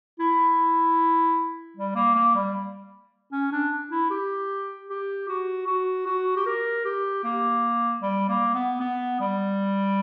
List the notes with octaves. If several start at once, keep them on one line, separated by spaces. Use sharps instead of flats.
E4
G3
A#3
A#3
G3
C#4
D4
E4
G4
G4
F#4
F#4
F#4
G4
A#4
G4
A#3
G3
A#3
B3
B3
G3